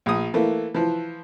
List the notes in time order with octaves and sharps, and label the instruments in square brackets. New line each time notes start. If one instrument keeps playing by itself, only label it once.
[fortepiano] A#1 D#6
E3 A3 A#3
E3 F3